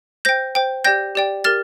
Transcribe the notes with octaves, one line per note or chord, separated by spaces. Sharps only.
C5 G5 G6 A#6
C5 G5
G4 D5 G5 G6 A#6
G4 D5 G5
G4 A#4 F6 A6